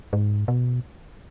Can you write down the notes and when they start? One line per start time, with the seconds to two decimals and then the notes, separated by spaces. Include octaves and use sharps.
0.13 G#2
0.48 B2